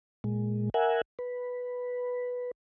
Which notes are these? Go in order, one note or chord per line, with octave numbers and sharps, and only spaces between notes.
A#2 G#3
A#4 E5 F#5 G#5
B4